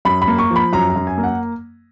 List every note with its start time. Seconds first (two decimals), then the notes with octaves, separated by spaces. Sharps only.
0.05 F#2 B5
0.22 B5
0.28 A#3
0.39 C#6
0.50 F3
0.56 B5
0.73 F#2 A#5
0.90 A#5
0.96 F#2
1.07 G#5
1.18 A#3
1.24 F#5